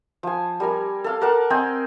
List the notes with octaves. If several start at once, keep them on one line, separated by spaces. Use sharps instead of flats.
F3 G#5
G3 A#4 G#5
A4 F5
A#4 D5 F#5 A5
C4 D#5 G5 G#5